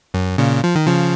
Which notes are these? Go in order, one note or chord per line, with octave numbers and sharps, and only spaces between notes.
F#2
A#2 C#3
F3
D#3
C#3 F3